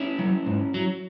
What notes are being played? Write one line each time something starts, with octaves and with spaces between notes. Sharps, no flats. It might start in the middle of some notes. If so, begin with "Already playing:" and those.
Already playing: C#4 E4
F#3
G#2
F#3